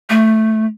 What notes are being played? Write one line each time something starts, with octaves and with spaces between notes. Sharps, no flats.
A3